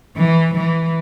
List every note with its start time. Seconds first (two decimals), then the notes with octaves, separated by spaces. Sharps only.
0.17 E3
0.55 E3